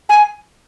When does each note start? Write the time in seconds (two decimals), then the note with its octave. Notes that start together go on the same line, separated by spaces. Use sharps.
0.09 G#5